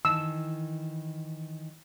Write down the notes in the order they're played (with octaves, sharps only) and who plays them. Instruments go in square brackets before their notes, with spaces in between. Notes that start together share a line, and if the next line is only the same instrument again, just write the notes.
[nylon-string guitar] D#3 E3 [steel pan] E6